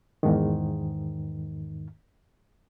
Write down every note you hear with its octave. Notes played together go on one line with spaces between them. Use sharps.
E2 G#2 D#3